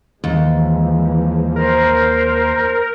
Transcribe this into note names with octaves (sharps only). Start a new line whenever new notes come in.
D#2 E3 F3 G#3
A#4 C5